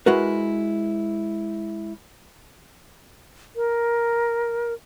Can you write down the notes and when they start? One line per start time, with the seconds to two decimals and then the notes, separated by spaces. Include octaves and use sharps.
0.06 G#3 E4 F#4 A#4 B4
3.56 A#4